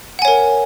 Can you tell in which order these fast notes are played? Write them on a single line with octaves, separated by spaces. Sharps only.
F#5 G#5 C#5 A#4